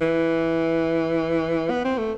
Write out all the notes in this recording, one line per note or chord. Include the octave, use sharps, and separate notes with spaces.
E3
B3
C4
A3